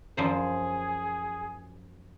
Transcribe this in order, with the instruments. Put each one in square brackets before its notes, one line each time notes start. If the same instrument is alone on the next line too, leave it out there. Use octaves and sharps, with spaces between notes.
[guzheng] F#2 F3 C5 [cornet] G#4